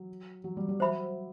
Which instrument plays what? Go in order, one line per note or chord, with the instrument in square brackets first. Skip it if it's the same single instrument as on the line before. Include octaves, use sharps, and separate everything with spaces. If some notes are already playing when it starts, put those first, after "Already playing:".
Already playing: [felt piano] F#3
F#3
G3
G3
[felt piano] F#3 [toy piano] C5 E5 B5